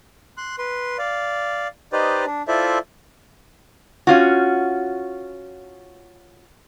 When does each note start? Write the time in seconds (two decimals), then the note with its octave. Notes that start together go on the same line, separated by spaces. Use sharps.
0.37 C6 F#6
0.58 B4 C6
0.99 D5 F5
1.93 D#4 G4 B4 C5 D5 D#5
2.26 D4
2.48 E4 F4 A4 C5 D5 E5
4.07 C#4 F4 F#4